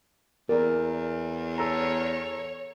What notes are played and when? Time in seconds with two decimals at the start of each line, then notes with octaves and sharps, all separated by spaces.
0.49 E2 A#4 D5
1.58 A4 C#5 A#5